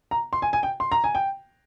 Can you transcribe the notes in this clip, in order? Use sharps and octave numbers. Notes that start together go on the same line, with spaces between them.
A#5
C6
G#5
G#5
G5
C6
A#5
G#5
G5